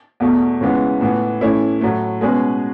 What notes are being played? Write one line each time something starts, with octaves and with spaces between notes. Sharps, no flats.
E2 B2 A3
C#3 E3 G#3 B3
A2 E3 B3
A2 E3 A3 C#4 E4
A2 F#3 A3
B2 G#3 C#4 G#4 B4